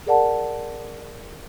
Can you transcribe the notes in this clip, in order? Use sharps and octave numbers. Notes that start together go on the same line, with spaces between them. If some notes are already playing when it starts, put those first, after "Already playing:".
G#4 A#4 D5 F#5 A5